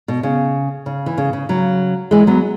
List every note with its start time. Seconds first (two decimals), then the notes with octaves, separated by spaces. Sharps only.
0.08 B2
0.23 C#3
0.86 C#3
1.06 E3
1.18 C#3
1.33 C#3
1.49 C#3 F#3
2.11 E3 G#3
2.27 F#3 B3